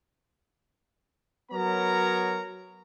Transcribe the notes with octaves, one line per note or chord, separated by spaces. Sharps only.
F#3 B3 A#4 C#5 A#5